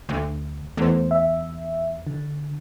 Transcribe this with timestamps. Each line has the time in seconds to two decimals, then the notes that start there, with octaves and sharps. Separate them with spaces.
0.09 D2
0.77 E2 A3 C5
1.11 E5
2.07 D3